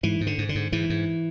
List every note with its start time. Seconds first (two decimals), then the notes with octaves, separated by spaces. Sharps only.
0.03 G#2 E3
0.21 G#2
0.27 D3
0.38 G#2
0.49 D3
0.55 G#2
0.72 G#2 E3
0.90 G#2